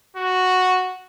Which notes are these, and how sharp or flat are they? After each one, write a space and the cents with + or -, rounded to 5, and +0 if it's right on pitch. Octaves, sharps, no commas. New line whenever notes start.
F#4 -5